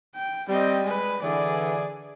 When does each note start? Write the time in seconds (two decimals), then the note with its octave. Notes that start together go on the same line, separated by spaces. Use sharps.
0.15 G5
0.49 G3 C4 D#5
0.83 G#3 B4
1.22 D3 E3 G#4 D5